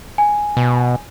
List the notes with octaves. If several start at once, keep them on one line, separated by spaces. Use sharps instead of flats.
G#5
B2